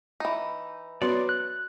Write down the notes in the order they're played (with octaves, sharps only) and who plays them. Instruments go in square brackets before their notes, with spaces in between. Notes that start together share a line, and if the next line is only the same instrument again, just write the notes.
[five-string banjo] E3 D#4
[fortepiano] F#3 B3 C6 [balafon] F#4 [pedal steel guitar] D5
[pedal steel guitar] F#6